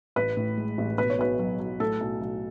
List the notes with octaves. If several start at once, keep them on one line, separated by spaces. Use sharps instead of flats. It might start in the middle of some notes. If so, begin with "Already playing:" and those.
A1 B4
A2
G#3
A1
B2 B4
C#5
B1 B4
F#3
F#3
A2 A4
B1
B1